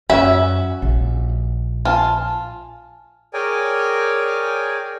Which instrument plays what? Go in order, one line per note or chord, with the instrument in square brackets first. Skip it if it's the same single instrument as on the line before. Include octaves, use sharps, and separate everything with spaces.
[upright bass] F#2 [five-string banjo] C#4 F#4 E5
[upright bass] A#1
[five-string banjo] F4 [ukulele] G#5 A5
[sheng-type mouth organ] G#4 A#4 C#5 D5 G5 G#5